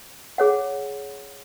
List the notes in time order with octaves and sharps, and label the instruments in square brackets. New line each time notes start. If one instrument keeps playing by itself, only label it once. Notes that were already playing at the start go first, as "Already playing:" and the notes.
[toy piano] G#4 C#5 F#5